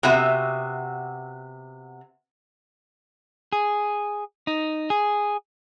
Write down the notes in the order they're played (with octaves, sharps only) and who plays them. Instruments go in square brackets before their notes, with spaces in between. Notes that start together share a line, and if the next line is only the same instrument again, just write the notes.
[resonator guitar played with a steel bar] C3 B3 F#4 E5
[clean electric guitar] G#4
D#4
G#4